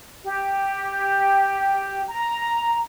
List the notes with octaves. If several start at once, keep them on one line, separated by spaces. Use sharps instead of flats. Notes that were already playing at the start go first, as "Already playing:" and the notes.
G4
A#5